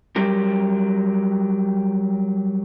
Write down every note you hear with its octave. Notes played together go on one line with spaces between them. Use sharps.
F#3 G3 G4 A#4